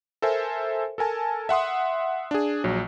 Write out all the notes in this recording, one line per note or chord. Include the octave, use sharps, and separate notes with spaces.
A4 A#4 C5 E5 G#5
A4 A#4 G#5 A5
E5 F#5 C6 D#6
D4 G#4
A#1 F#3